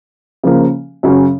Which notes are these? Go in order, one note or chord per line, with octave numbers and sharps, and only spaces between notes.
C#3 F3 A#3
F#2 C#3 F#3 C#4